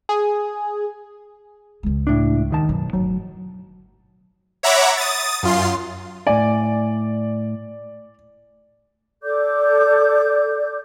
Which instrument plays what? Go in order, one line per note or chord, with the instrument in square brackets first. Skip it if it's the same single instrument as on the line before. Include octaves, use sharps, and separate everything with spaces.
[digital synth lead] G#4
[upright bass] C#2 G#3
[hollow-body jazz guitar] A2 D4
D#2 D#3 A5
[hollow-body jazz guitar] B1 [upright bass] F#2
[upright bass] G1 A2 [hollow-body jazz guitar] F#3
[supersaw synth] C#5 E5 F#5 A#5 B5 D6
D#6 A6
F#2 F4 C6
[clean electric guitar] A2 G#5 [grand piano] D5
[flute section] A4 D5 D6 G6